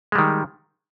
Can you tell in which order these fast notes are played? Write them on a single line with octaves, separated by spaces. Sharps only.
G#3 G3 D#3